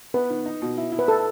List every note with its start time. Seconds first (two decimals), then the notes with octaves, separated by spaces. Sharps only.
0.14 B3 B4
0.30 D#3
0.46 D#4
0.62 B2
0.77 E4
0.92 E4
0.99 B4
1.08 A4